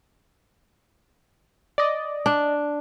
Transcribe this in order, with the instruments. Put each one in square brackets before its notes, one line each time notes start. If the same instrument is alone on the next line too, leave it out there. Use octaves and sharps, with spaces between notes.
[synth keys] D5 D#5
[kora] D4